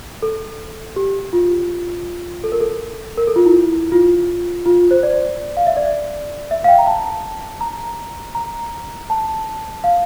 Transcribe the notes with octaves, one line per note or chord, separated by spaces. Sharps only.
A4
G4
F4
A4
A#4
A4
A#4
A4
F4
E4
F4
F4
C5
D5
F5
E5
D5
E5
F5
G5
A#5
A5
A#5
A#5
A5
F5